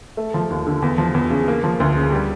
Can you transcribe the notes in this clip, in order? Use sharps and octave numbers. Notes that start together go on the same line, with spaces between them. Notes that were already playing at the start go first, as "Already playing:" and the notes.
A3
F3
D#2
D3
E2
F3
E2
C#3
A#3
F3
D2
C#3
G3